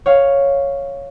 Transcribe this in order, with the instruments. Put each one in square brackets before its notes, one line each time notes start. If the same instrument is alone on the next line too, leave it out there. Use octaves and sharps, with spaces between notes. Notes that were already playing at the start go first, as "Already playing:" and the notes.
[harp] C#5 F5